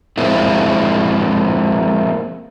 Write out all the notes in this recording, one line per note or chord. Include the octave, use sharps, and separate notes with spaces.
F3 G#3 A#3 C4 E4